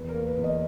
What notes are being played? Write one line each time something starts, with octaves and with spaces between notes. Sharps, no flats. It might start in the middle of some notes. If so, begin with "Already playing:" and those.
Already playing: E2 B4
A#4
A#3
B4
E2
D#5